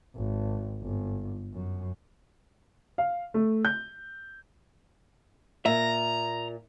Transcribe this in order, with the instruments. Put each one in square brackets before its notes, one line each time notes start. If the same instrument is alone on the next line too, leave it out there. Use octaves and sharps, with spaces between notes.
[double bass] G#1
G1
F#2
[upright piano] F5
A3
G6
[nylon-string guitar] A#2 [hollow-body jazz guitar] E5 [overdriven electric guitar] A#5